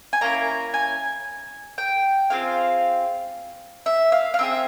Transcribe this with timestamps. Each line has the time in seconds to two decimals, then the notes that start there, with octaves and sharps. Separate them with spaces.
0.13 G#5
0.21 A#3 C#4 E4 A#5
0.74 G#5
1.78 G5
2.30 C4 F4 G#4 F5
3.86 E5
4.12 F5
4.34 F5
4.39 C4 E4 G#4 E5